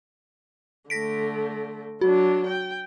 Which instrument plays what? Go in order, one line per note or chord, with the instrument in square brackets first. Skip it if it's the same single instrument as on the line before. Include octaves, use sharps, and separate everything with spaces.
[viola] D3 A3 [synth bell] A#6 B6 D7
[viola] F#3 D4 [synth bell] F#4
[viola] G5